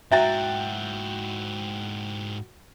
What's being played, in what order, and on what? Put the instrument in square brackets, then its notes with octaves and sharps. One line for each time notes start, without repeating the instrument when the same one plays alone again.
[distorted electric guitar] G#2 E4 [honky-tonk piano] F#4 G5 A6 [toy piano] E5 A#5